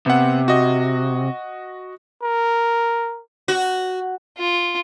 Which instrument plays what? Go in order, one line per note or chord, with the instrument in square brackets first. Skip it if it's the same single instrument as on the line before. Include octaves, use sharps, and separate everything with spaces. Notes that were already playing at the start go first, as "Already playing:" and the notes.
[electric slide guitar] C3 [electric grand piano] B3 F#5
[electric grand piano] F#4 D#5
[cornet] A#4
[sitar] F#4
[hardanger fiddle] F4